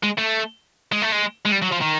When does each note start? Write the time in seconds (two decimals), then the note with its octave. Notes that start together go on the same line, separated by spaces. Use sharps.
0.03 G#3
0.18 A3
0.92 G#3
1.02 A3
1.12 G#3
1.46 G#3
1.52 G3
1.63 F#3
1.72 F3
1.81 D#3